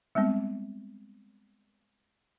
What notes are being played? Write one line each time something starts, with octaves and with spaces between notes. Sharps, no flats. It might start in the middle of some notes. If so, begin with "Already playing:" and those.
G3 G#3 B3 C4